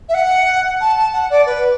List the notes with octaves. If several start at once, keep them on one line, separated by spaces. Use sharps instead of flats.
E5
F#5
A5
A5
F#5
D5
B4